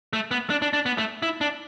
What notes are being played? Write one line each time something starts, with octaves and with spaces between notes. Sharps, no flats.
A3
B3
D4
D4
D4
B3
A3
E4
D4